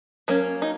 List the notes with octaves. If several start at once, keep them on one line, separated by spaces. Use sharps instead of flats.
F#3 A#3 C#4
D#4